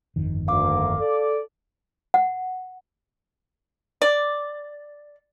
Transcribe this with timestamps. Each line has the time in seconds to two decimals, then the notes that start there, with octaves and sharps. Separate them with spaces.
0.16 G1 F2 D#3
0.48 D2 A#3 F5 D6
0.99 A4 D5
2.14 F#5
4.02 D5